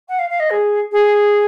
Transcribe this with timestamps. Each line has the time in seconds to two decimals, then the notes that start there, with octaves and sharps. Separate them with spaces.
0.08 F#5
0.18 F5
0.29 F5
0.39 D#5
0.50 G#4
0.92 G#4